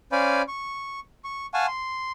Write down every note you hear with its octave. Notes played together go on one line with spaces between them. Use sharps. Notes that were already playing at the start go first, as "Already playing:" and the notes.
C#4 C5 D5 F5 G#5 B5
C#6
C#6
F5 F#5 G#5 A5 C#6
C6